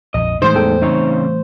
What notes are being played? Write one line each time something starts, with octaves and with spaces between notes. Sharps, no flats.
A#1 F2 D#5
A2 E3 G3 G#3 D#4 C5
E2 A4 G5
C#3 C4 D#4 C#5